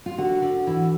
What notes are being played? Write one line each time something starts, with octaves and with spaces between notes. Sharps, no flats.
F4
D3 F#4
D3
E3